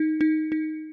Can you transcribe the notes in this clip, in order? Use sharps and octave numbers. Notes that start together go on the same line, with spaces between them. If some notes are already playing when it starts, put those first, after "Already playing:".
Already playing: D#4
D#4
D#4